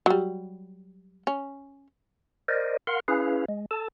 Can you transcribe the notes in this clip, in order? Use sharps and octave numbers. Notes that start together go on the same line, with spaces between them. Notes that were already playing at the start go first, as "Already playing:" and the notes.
F#3 G3
C#4
A#4 C5 D5 D#5
A#4 F5 F#5 C6
C#4 E4 G#4 B4 F5
G#3
A4 A5